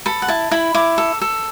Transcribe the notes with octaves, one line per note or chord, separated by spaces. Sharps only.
A4 B5
F#5
E4 A5
E4 B5
E4 D6
A4
A4